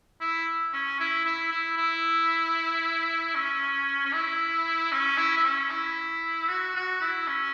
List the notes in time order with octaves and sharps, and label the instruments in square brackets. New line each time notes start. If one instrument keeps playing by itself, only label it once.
[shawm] E4
C#4
E4
E4
E4
E4
C#4
C#4
E4
C#4
E4
E4
C#4
E4
F#4
F#4
E4
C#4